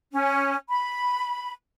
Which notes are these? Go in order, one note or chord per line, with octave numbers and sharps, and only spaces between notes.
C#4
B5